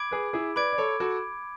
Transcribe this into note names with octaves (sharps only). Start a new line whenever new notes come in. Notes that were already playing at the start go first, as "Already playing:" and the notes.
Already playing: B5 D6 G#6 D7
G#4 B4
E4 G#4
B4 D5 B5 D6 G#6 D7
D5
A4 C#5
F#4 A4